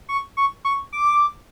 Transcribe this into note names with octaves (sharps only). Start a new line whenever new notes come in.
C#6
C#6
C#6
D6